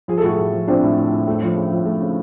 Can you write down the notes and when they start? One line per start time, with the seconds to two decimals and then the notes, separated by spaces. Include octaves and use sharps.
0.08 F3 G#4
0.18 A4
0.23 A2 F#4 G#4
0.38 A2
0.52 F3
0.68 F3 C4 D4
0.83 A2
0.97 A2
1.12 A2
1.28 A3
1.42 F3
1.56 C#3
1.72 F3
1.86 A3
2.01 C#3